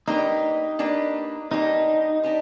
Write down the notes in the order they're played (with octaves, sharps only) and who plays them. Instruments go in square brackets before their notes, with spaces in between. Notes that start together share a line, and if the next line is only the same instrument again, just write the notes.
[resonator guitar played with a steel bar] A#3 D4 G4 B4 [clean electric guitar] D#4
[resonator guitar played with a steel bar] A#3 D4 G4 B4
[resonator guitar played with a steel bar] A#3 D4 G4 B4 [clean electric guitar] D#4
[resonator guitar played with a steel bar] D4 G4 B4